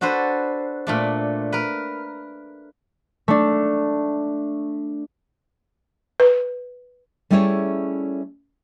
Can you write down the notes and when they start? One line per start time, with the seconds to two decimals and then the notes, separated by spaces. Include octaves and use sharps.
0.01 D4 F#4 A4 B4 C5
0.87 A#2 A3 D4
1.52 A#4 B4
3.28 A3 D4
6.20 B4
7.30 G3 A3 C#4 E4 G#4 C#5